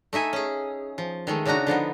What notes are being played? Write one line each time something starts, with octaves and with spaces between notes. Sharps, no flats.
A3 D#4 E5 G#5
C#4 G#4
F3
D#3 G#3 A3
C#3 D4 D#4 F#4 A#5
D3 F3 B3 D#4